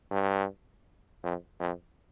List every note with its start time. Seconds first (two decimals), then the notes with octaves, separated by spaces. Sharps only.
0.11 G2
1.23 F2
1.60 F2